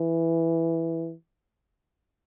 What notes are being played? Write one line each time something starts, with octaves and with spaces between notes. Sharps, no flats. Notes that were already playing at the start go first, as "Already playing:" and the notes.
Already playing: E3